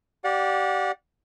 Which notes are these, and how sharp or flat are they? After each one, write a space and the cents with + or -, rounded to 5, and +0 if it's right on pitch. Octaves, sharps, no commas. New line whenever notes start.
G4 -25 D5 +0 F#5 -35